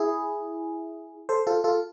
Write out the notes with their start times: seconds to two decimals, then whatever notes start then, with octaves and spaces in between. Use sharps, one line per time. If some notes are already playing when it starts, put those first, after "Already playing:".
Already playing: E4 G#4
1.29 A4 C5
1.47 F4 A4
1.64 F4 A4